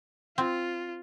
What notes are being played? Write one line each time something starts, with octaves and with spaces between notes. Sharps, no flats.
C4 F4